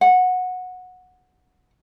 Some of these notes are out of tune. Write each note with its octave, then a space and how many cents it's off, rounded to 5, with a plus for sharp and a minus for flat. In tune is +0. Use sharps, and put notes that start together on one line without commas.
F#5 -15